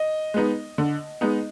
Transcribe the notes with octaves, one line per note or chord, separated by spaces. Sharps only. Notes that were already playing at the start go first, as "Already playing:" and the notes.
Already playing: D#5
G#3 B3 D#4
D3
G#3 B3 D#4